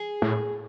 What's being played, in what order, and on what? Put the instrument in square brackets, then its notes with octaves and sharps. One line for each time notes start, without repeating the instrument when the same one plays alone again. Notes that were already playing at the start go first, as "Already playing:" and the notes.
Already playing: [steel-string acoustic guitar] G#4
[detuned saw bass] A2